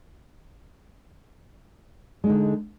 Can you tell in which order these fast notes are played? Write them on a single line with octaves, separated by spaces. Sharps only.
G#3 D#4 D3